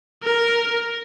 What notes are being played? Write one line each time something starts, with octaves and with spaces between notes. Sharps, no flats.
A#4